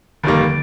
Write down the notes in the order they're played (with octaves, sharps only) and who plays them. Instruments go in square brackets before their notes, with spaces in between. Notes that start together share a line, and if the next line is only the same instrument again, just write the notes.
[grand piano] F1 D#2 D#3 G3 A#3 [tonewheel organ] D3